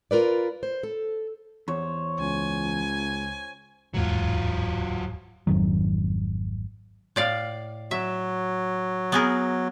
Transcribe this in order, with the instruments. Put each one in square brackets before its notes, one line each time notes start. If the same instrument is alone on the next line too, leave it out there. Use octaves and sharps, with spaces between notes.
[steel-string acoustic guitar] F4 A#4 B4 D5
C5
A4
[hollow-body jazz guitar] E2 [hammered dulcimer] C5 C#5
[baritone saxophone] C#2 [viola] G#5
[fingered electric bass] D1 E2 G#2 [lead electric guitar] F#3 F4
[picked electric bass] G#1 F2 D#3 F#3
[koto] A2 D5 F5
[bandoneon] F#3 [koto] E5
[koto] B3 G#4 A#4